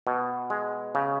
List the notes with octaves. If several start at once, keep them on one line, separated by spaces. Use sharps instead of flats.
B2
G#3
C#3